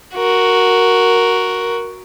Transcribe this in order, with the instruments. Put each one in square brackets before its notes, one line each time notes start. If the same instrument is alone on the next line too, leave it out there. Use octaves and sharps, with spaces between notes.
[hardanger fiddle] F#4 A#4